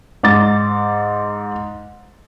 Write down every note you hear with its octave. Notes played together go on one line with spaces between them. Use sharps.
G#2 D6 A6